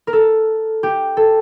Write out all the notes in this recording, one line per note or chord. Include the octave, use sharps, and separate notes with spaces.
A#4
A4
G4
A4